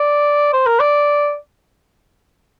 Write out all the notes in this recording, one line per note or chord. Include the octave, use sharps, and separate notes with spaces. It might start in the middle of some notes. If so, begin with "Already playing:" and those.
Already playing: D5
C5
A#4
D5